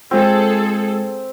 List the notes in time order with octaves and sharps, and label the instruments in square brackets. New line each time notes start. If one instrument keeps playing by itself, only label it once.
[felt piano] G#3 F4 [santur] C4 [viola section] G#4 A4